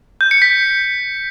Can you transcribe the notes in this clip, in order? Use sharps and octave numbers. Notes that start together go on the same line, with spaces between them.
G6
C#7
B6